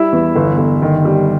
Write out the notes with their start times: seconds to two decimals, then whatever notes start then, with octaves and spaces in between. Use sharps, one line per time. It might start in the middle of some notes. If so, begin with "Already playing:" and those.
Already playing: G3 E4 E5
0.13 E2
0.36 G1
0.58 G1
0.82 D#3
1.05 G3